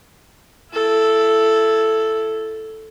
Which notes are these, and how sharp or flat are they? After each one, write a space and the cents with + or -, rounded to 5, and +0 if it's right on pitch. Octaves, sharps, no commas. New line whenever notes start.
E4 +25 A4 +0